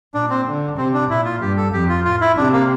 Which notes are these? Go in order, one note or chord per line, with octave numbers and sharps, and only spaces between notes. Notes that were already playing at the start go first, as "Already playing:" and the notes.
A#2 D4
C4
D3
C3 C4
D4
A#2 E4
F4
G2 G4
A4
F2 G4
F4
A2 F4
E4
C3 D4
A#3